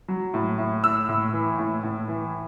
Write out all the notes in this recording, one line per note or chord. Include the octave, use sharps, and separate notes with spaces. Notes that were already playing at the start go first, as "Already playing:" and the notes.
F#3
A2
A2
A2 E6
A2
E3
A2
A2
E3